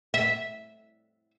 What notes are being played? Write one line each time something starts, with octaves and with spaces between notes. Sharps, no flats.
E5